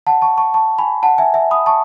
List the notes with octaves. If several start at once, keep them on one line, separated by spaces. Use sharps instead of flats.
F#5 A5
A5 C#6
A5 C#6
A5 C#6
G#5 B5
F#5 A5
E5 G#5
E5 G#5
B5 D#6
A5 C#6